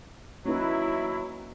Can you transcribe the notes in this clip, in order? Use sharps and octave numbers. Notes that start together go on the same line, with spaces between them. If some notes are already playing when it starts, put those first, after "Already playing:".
F#3 A#3 C#4 D#4 E4 B4